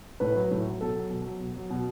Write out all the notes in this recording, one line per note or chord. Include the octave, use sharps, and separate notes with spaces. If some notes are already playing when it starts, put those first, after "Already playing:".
A2 B4
F#3
A2
F#3
B2 A4
F#3
B2
F#3
B2
F#3
B2